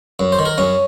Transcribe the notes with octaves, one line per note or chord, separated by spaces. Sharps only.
F#2
C5
D#3
A#4
F#2 C#4